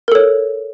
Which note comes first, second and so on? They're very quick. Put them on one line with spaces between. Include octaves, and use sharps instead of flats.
A#4 A4 C#5